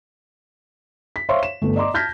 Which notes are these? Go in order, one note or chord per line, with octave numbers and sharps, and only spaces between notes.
B6
C5 C#5 E5 F5 C6 C#6
E7
G1 A3
D5 D#5 A#5 C6 D6
A5 F6 G6 G#6 A#6 B6